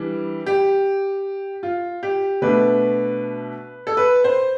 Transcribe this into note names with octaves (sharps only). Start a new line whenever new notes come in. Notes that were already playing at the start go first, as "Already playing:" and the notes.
Already playing: E3 G3 D4
G4
F4
G4
B2 A3 D4 B4
A4
B4
C5